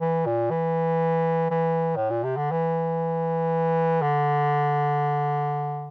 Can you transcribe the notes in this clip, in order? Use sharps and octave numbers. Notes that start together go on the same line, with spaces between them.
E3
A#2
E3
E3
A2
A#2
C3
D3
E3
D3